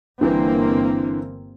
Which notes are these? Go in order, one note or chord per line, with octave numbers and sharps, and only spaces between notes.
G1 D3 E3 A#3 C4